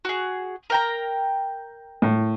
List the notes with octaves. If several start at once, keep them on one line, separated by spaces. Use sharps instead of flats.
F#4 G#4
A#4 G5 A#5
A2